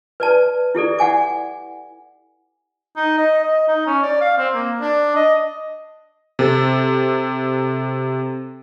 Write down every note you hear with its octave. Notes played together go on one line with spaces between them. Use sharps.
B4 D5 A5
E4 G4 A4 D5
D5 F#5 G#5 D6
D#4
D#5
D#5
D#4
C#4
D5
F5
C4
A#3
D4
D#5
C3 A4